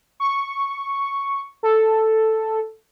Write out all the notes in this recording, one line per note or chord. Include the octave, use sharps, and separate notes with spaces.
C#6
A4